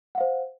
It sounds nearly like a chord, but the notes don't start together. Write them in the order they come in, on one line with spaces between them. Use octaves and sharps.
F#5 F5 C5